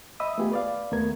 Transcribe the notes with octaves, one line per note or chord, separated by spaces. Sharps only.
D#5 E5 B5 D#6 E6
A3 B3 F4 G4 G#4
B4 D5 F5
D#2 A3 B3 A#4 G#6